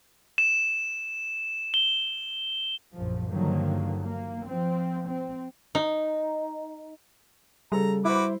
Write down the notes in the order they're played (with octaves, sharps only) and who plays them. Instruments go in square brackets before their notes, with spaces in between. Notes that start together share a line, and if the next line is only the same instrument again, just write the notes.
[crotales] E7
G7
[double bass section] A#1 F#2 F3
G2 D3 D#3 F3 F#3 A#3
A#3
F3 C4
C4
[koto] D#4
[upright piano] C#3 A4 [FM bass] G3 [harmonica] A#5
[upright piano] E4 C5 [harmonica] F#4 B4 D6